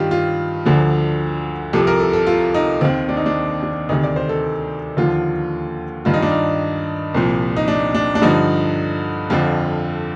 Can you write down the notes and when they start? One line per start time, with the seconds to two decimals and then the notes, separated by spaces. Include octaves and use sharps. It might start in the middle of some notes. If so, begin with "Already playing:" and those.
Already playing: G2 D#3 F4 G4
0.11 F4
0.65 D2 D3 F3
1.73 C2 C3 F3 A4
1.87 A#4
2.00 A4
2.13 A4
2.27 F4
2.54 D#4
2.81 D#2 D#3 C4
3.09 D4
3.17 D#4
3.26 D4
3.63 D4
3.89 D2 C3 D#3 D#4
4.03 D5
4.16 C5
4.29 A4
4.97 D#2 D3 F3 F4
6.05 G2 D#3 F4
6.14 D#4
6.22 D4
6.31 D#4
7.14 C2 A#2 F3
7.57 D#4
7.68 D4
7.95 D4
8.15 D4
8.22 G2 D3 F3 D#4
9.30 F2 D3 F3 F4